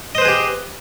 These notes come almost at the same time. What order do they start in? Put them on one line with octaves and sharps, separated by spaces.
D#5 C5 B4 G#4 G4